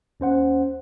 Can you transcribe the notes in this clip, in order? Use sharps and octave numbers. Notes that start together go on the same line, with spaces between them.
D#2 C#4 C5 F#5